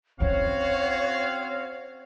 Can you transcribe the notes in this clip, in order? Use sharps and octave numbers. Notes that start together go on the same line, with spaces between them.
C4 C#4 E4 F#4 C#5 F5